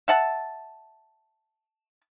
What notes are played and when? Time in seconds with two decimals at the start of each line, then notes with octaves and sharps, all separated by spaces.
0.08 E5 F#5 A5